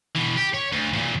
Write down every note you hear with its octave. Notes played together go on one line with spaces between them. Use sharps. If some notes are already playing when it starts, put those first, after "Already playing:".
B2 E3
G4
C#5
D2
E2 A#2